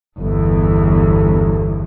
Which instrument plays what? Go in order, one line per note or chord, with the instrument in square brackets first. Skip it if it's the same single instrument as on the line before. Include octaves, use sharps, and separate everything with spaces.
[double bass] G1 E2